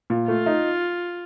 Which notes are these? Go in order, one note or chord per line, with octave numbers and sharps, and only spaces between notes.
A#2
A3 F4
D#4